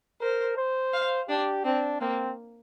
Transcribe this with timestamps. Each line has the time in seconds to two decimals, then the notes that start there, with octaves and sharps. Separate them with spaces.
0.21 A#4 C5
0.57 C5
0.93 F5
1.29 D4 G4
1.64 C4 D4
2.01 A#3 C4